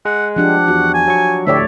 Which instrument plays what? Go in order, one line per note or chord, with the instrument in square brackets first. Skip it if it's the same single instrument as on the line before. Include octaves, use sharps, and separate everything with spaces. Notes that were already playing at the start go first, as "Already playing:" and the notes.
[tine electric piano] G#3 [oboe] F#5
[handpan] F3 D4 G4 [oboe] F#5
[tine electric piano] E2 [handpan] F#4
[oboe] G#5
[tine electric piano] F#3 C#6
[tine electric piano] D2 A2 G4 [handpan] A3 C#5 D5 [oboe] E5